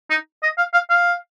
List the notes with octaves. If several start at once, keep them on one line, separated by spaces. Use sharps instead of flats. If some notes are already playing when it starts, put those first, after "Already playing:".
D#4
D#5
F5
F5
F5